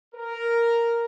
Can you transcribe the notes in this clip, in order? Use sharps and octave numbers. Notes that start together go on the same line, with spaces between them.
A#4